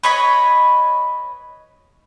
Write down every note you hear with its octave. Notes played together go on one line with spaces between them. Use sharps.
B4 C#5 D#5 B5